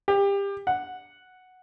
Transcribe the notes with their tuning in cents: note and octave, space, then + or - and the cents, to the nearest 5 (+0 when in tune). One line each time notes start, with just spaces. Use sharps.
G4 +25
F#5 +0